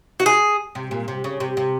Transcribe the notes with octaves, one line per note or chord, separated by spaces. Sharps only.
F#4
G#4
C3
A#2
C3
C#3
C3
C3